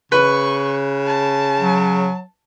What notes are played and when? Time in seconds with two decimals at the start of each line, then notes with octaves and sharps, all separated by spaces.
0.12 C#3 B4 C#6
1.07 A5
1.61 F#3